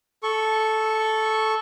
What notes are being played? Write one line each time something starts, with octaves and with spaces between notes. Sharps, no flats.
A4 C#6